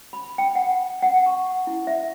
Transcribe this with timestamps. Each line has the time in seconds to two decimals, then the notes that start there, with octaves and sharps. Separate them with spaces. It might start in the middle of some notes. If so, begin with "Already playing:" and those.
0.13 B5
0.38 G5
0.55 F#5
1.03 F#5
1.26 C#6
1.67 E4
1.87 E5